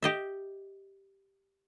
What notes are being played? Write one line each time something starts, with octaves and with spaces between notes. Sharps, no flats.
G4 D#5 E5